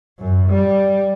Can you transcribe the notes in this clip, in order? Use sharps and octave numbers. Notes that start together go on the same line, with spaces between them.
F#2
G3